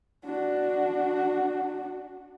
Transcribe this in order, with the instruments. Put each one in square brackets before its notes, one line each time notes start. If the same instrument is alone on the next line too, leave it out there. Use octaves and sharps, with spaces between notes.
[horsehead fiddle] D4 F#4